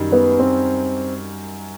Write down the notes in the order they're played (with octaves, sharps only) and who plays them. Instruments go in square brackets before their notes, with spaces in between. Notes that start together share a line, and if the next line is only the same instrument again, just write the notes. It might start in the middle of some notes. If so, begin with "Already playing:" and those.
Already playing: [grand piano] F#2 D#3 G3
[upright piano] B3
C4